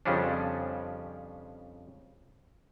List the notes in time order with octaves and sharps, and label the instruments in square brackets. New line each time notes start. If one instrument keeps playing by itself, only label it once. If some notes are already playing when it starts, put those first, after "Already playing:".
[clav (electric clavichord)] F2 C#3 F3 G3 C#4 D4